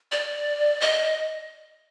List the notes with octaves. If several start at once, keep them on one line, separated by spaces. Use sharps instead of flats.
D5
D#5